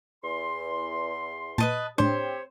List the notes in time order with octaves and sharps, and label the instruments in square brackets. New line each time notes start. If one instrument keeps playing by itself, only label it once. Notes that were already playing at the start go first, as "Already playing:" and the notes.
[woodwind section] E2 C6
[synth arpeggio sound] A#2 [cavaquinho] B4 D#5 A5
[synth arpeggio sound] A2 D4 [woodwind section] C4 G4 C#5 [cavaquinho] C5